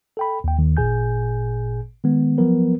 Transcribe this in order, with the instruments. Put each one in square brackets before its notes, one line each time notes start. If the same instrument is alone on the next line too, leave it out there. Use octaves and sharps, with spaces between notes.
[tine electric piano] A4 G5 B5
D#2 G5
D#2 D#3
G#1 A#2 G#4 G#5 G6
D#3 G#3 B3
F3 F#3 B3 A#4 B4